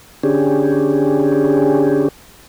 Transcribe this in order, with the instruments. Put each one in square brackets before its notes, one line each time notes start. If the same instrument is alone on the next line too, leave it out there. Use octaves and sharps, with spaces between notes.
[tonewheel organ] D3 C#4 D4 G4 G#4